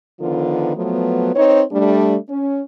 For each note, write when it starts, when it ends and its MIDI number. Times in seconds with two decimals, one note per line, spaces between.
0.21 0.75 50
0.21 0.75 51
0.21 0.75 53
0.21 0.75 59
0.21 0.75 65
0.21 0.75 70
0.76 1.33 53
0.76 1.33 54
0.76 1.33 57
0.76 1.33 59
1.35 1.62 60
1.35 1.62 63
1.35 1.62 71
1.35 1.62 73
1.72 2.16 55
1.72 2.16 57
1.72 2.16 62
2.29 2.61 61